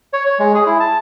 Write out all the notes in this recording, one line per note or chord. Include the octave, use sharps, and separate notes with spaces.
C#5
C#5
G#3
G#4
E4
A5